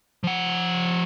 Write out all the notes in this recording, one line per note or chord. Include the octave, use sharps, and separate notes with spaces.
F3 F#5